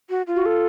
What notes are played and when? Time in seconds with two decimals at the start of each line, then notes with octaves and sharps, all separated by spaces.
0.10 F#4
0.27 F4
0.36 F#4
0.46 A4